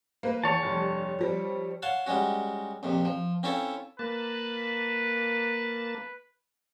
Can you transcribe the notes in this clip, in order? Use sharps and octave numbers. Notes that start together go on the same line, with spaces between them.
A#3 B4
E2 C#5 A5
F1 G2
F3 G3 C4
C#5 F5 F#5 A5 C6
G3 G#3 C#4 F#4
A#1 F2 C3
F3
C4 C#4 E4 F4 A4 C#5
A#3 B4 A5